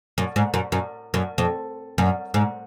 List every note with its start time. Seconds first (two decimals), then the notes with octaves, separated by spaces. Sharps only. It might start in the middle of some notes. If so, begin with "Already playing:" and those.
0.18 F#2
0.36 G#2
0.54 F#2
0.72 F#2
1.14 F#2
1.38 F2
1.98 F#2
2.34 G#2